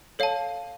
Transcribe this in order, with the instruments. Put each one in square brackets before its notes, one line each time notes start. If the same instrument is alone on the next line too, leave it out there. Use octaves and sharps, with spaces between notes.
[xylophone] A4 C#5 F5 A5